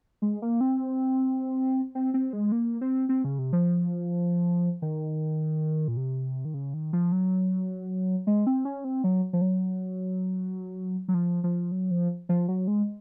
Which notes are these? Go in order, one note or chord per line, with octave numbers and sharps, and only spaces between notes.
G#3
A#3
C4
C4
C4
G#3
A#3
C4
C4
C#3
C3
F3
D#3
A#2
C3
D#3
C#3
D#3
F3
F#3
G#3
C4
C#4
C4
F#3
F3
F#3
F#3
F3
F3
F#3
F3
F3
F#3
G#3